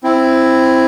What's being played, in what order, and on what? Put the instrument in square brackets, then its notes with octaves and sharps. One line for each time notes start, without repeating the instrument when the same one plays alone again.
[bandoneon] C4 E4